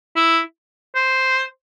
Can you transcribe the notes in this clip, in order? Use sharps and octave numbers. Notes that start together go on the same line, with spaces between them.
E4
C5